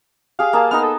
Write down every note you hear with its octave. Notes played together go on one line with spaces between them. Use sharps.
G4 G#4 F5
A#3 G#4 A5
B3 D#4 D#5 F6
A4